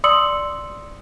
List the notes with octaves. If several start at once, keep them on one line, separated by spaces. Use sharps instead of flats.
D5 C6 D#6 E6 C#7 F#7